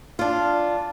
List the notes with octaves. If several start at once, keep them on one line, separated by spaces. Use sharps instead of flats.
D4 F4